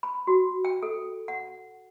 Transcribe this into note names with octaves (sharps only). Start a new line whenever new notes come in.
B5
F#4
G5
A4
F#5